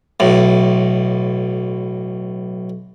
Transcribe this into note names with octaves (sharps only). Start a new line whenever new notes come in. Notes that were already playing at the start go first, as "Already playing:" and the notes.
B1 A2